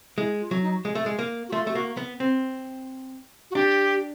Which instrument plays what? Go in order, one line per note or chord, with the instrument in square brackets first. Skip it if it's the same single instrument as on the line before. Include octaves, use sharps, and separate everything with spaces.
[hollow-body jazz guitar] G#3 [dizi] E4
[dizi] F4
[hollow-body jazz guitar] F#3
[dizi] D#4
[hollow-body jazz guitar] G#3
A3
G#3
A#3
[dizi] F#4
[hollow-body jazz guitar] A3 [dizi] F4
[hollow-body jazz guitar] A3 [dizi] G4
[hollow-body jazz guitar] A#3 [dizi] F#4
[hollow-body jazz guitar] B3
C4
[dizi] F#4
[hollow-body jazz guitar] D4 [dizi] G4